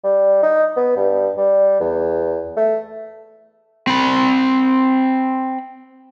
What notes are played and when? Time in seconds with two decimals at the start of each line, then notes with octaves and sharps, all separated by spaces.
0.04 G3
0.43 D#4
0.76 B3
0.97 G2
1.37 G3
1.80 E2
2.57 A3
3.87 C4 B5